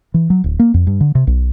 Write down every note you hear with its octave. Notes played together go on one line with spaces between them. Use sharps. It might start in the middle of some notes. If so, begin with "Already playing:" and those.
E3
F#3
D1
A#3
F2
G2
D3
C3
B1